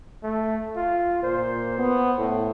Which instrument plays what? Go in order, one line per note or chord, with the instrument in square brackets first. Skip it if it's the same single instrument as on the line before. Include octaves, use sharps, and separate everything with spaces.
[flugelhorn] A3
F4
[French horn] A#2 [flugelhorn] C5
[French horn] B3
A2